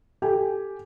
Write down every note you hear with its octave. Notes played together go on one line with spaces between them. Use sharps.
G4 A4 G5 G#5